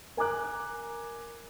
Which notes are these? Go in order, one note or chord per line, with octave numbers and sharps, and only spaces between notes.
A#4 G#5 A#5 D6 F#6